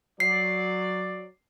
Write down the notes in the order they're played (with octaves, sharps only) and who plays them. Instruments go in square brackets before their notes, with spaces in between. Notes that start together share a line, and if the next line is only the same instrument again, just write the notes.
[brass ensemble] F#3 D5 [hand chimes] C7